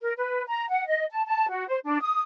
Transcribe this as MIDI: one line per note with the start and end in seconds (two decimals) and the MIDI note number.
0.01 0.12 70
0.17 0.44 71
0.47 0.68 82
0.69 0.86 78
0.87 1.05 75
1.11 1.24 81
1.27 1.49 81
1.49 1.66 66
1.68 1.78 72
1.85 2.01 62
2.01 2.22 87